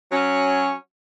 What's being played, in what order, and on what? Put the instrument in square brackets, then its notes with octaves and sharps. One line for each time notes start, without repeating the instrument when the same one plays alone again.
[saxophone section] F#3 C#4